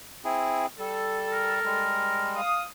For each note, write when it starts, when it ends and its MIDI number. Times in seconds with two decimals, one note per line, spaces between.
0.25 0.66 60
0.25 0.66 64
0.25 0.66 68
0.79 1.60 55
0.79 1.87 69
1.32 2.39 70
1.65 2.41 55
1.65 2.41 56
2.36 2.63 77
2.36 2.63 87